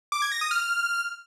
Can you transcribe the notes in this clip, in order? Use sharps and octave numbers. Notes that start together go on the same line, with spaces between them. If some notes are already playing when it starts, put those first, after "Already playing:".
D6
G#6
A#6
D#6
F6